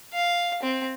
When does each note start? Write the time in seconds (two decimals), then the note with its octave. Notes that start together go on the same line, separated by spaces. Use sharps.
0.13 F5
0.62 C4